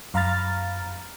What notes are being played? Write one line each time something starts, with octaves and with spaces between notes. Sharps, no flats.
F#2 F5 A#5 B5 F6 A6